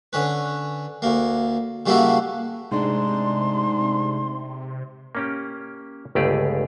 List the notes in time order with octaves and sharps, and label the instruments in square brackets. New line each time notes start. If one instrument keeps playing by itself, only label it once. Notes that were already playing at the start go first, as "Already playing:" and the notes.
[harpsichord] D3 C#4 B4
D2 A#3
C#3 G3 A#3 E4 F#4 A4
[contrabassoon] G#2 [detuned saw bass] C3 [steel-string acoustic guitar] G#3 A3 D4 [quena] C6
[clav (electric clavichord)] A#3 C#4 G4
G1 C#2 A3 G4 G#4 D5